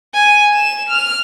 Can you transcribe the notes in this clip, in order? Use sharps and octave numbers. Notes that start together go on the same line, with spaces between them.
G#5
E7
F6